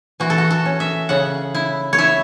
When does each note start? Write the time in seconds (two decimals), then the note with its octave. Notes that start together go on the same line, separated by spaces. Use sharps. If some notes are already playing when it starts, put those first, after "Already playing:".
0.20 E3 F#4
0.30 A4
0.38 F#4
0.51 A4
0.66 C#4
0.80 E5
1.09 C#3 F#5
1.54 E4
1.93 C#5
1.98 E4 E5